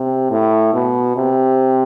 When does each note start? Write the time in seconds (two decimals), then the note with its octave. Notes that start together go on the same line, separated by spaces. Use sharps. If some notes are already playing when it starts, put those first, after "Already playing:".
Already playing: C3
0.31 A2
0.74 B2
1.16 C3